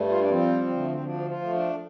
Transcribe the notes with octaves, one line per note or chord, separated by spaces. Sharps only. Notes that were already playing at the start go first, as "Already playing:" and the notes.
Already playing: G2 G3 A3
F4
D4
F3 C4
D2
A3
C4
F3 D4
F4
A3
D4